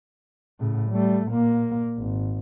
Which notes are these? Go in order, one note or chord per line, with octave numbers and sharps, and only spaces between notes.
A2 C#3
G3 A3
A#2 A#3
G#1